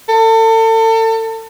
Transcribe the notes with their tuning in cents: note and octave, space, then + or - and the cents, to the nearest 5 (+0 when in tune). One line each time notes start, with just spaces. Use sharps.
A4 +35